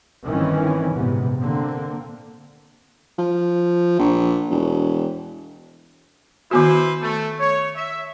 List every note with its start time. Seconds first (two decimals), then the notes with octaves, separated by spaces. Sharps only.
0.24 G1 D#3 E3 C4 C#4
0.94 A#1 G#2 C3 B3
1.40 D3 A#3 C4
3.18 F3
3.99 A#1
4.50 E1
6.51 D#3 B3 E4 F#4 B4 C5
7.02 A3
7.40 C#5
7.76 E5